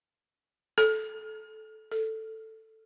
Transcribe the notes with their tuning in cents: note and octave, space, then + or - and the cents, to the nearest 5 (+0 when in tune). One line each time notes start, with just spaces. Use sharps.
A4 -20
A4 +5